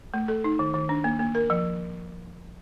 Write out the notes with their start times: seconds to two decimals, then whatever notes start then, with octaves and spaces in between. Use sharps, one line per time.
0.14 A3
0.28 A4
0.44 D#4
0.59 D#3
0.74 D#3
0.89 D4
1.04 A#3
1.19 A#3
1.35 A#4
1.50 F3